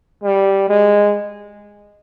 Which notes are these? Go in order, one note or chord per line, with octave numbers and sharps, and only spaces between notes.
G3
G#3